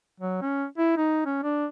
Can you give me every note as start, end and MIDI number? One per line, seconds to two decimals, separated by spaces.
0.20 0.38 54
0.42 0.66 61
0.78 0.95 64
0.97 1.23 63
1.26 1.39 61
1.43 1.66 62